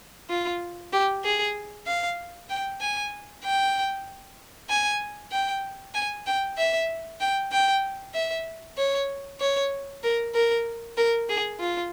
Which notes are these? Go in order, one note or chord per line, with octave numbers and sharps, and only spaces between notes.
F4
G4
G#4
F5
G5
G#5
G5
G#5
G5
G#5
G5
E5
G5
G5
E5
C#5
C#5
A#4
A#4
A#4
G#4
F4